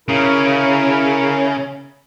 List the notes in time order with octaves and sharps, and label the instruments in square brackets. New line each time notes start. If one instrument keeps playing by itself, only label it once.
[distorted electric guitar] C#3 [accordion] E4 A#4